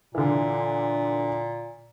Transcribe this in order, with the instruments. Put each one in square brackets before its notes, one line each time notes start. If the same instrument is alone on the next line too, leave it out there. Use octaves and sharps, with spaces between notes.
[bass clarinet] A#2 [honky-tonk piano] D3 E3